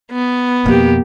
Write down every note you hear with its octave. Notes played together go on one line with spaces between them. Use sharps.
B3
F2 B2 A#3 G4